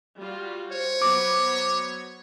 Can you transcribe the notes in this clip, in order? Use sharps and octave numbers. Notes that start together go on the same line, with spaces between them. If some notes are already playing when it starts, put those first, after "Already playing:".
G3 F4 F#4
C5 C#5
F#3 B3 D6